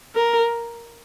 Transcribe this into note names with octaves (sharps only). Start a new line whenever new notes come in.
A#4